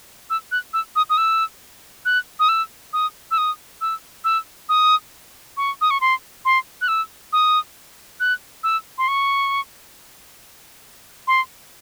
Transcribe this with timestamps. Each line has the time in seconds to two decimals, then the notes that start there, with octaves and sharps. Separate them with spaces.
0.30 E6
0.52 F#6
0.73 E6
0.96 D#6
1.10 D#6
1.18 E6
2.05 F#6
2.40 D#6
2.49 E6
2.93 D#6
3.31 E6
3.38 D#6
3.81 E6
4.24 E6
4.69 D#6
5.57 C#6
5.81 D#6
5.91 C#6
6.01 C6
6.45 C6
6.81 F#6
6.88 E6
7.33 D#6
8.20 F#6
8.64 E6
8.98 C6
9.08 C#6
11.27 C6